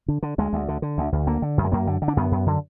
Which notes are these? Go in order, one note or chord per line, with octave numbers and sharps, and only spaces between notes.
D3
D3
D2 G#3
D2
D3
D3
D2
D2
D3 A#3
D3
F#2
G#3
F#2 A#3
D3
D3
D4
F#2 B3
F#2
D3